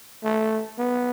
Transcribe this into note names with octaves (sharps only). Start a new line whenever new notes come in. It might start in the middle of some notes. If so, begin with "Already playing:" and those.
A3
B3